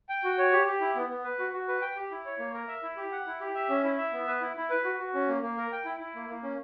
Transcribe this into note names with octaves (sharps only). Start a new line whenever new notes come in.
G5
F#4
C#5
G4
G4
E4
B3
B3
B4
F#4
F#4
B4
G5
G4
E4
C#5
A#3
A#4
E5
E4
G4
F#5
E4
G4
E5
C#4
E4
E5
B3
B4
E4
E4
B4
F#4
F#4
C#4
A#3
A#3
A#4
G5
E4
E4
A#3
A#3
C#4